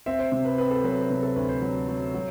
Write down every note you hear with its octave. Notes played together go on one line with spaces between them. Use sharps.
C4 E5
C5
C3
B4
C4 B4
A4
F#3 B4
C5
C3 B4
A4
D2 B4
C5
F#3
F#3
F#3